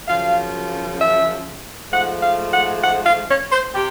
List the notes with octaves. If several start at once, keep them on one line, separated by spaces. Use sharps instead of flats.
F#2 C#3 F3 F5
E5
G#2 F3 A3 F#5
F5
F#5
F#5
F5
C#5
C5
C3 G4